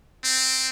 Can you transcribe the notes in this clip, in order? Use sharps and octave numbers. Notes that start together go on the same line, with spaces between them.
C4